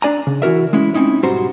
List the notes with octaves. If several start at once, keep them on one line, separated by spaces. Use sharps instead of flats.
D4 D5 G#5 A#5
C#3
E3 E4 F#4 A#4 E5
G#3 C#4 E4
C4 C#4 D#4 E4
B1 G#2 G3 F#4 C5 A#5